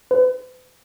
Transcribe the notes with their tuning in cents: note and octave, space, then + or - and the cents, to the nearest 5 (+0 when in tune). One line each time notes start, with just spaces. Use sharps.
B4 +45